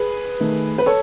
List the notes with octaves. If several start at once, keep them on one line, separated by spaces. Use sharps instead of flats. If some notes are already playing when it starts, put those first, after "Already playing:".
Already playing: G#4 B4
D#3 A3
B4
A4 C#5